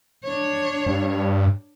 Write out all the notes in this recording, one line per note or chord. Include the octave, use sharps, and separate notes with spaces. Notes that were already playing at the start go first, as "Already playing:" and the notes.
D4 C#5
G2